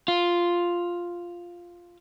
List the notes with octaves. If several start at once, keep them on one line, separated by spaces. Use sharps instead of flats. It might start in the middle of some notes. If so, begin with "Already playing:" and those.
F4